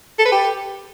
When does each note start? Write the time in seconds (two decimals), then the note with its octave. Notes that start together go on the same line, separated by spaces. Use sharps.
0.19 A4
0.25 B4
0.32 G4